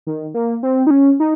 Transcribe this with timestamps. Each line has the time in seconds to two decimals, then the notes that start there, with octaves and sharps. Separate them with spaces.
0.07 D#3
0.34 A#3
0.63 C4
0.87 D#4
0.91 C#4
1.20 D#4